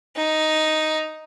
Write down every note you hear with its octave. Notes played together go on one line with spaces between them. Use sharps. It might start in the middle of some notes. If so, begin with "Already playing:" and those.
D#4